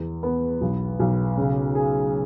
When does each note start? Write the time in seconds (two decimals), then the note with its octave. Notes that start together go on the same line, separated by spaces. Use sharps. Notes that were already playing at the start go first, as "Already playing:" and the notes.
Already playing: E2
0.23 B3
0.61 B1
1.00 B1
1.37 C#3
1.75 G#4